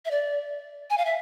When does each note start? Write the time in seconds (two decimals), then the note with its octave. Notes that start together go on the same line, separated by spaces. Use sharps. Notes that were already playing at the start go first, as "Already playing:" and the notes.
0.05 E5
0.11 D5
0.90 G#5
0.98 F5
1.05 E5